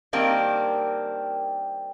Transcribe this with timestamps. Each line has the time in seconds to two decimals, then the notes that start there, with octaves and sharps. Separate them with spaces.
0.13 D#3 G3 A#3 C4 D4